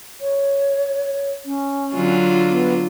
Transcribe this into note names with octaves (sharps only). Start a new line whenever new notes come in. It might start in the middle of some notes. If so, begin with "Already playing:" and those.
C#5
C#4
D3 F#3 F4
B3